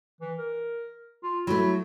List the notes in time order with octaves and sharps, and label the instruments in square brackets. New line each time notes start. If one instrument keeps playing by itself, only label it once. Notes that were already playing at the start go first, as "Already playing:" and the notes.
[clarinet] E3
A#4
F4
[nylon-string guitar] F#3 A3 [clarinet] E4